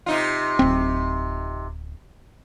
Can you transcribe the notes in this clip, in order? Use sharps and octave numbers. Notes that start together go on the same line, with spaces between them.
C3 D#4 F4
D1 C4